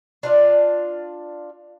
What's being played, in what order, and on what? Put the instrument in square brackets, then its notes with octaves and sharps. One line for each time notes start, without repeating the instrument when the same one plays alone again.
[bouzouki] D4 F4 D5